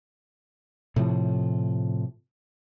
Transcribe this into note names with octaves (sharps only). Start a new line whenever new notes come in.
A2 C3 F3